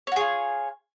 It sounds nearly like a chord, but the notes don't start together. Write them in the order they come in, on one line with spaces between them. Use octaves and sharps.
C#5 F#4 G#4 F4